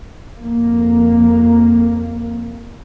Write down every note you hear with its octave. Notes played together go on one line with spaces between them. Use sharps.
F2 A#3